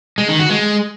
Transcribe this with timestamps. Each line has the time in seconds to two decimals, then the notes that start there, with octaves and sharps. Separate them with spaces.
0.18 G#3
0.29 D#3
0.40 F#4
0.50 G#3